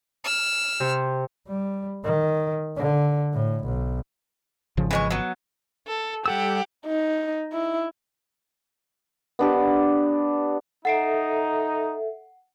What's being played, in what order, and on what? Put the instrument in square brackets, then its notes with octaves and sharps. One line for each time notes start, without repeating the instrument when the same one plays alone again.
[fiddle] E6 F6
[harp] C3
[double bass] G3
D#3
D3
A2
B1
[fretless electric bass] G#1 C#3 F3
[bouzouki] E3 G#3 C#5
F#3 B3
[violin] A4
[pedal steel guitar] G3 A4 E6 [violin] G4 F#5
[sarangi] D#4
E4
[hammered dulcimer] B3 D4 G4
[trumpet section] D#4 [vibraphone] A4 E5 [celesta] F#5 C7 D7